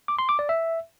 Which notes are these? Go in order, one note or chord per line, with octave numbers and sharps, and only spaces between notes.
D6
C6
D6
D5
E5